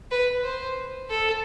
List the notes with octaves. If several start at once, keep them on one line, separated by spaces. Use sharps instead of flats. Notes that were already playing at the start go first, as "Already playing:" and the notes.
B4
C5
A4